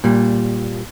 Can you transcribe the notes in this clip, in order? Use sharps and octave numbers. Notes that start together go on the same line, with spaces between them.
A#2 G3